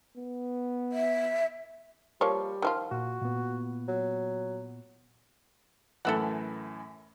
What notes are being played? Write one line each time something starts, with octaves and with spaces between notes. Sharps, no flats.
B3
E5
F3 G3 A#3 C#5
D#3 F3 F4
A#2 F#4
A#2 B3
F#3
F#2 A2 E3 A4 E5 F#5